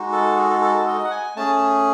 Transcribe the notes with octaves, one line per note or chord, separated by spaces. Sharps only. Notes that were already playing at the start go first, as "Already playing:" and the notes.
Already playing: G#3 D#4 F#4
A4
G#4
A4
A4
A4
D#5
F#5
G#5
A3 C#4 G#4 A5